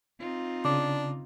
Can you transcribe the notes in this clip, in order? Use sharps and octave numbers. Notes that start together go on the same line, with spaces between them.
C4 D#4 F4
C#3 D4 D6